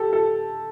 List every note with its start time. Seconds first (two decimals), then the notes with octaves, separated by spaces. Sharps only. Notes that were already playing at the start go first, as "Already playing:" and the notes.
Already playing: G4 A4
0.13 A4